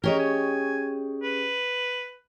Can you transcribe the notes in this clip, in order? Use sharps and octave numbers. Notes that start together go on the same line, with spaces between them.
C#4 G4 G#4 A#4 C#5 D#5
G#5
B4